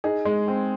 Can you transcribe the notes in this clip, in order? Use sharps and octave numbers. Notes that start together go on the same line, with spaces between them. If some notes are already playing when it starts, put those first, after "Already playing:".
D#4 G#4
G#3
C4